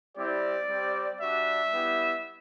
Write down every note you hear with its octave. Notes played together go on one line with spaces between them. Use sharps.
G3 C4 E4 G4 D5
G3 C4 G4
G3 D4 F#4 E5
G3 B3 E4 G4